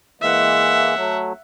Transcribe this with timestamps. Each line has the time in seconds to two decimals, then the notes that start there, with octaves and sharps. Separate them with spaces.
0.21 E3 G#3 A#3 E5 F#5
0.96 F#3 A3